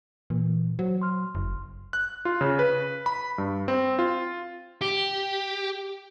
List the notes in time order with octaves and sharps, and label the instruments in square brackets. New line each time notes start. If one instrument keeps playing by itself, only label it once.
[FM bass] A#2 [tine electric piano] E3
[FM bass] F#3 [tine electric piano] C5
[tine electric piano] C6 F6
[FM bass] F#1
[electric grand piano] F#6
F4
C#3
B4
B5
G2
C4
F4
[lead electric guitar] G4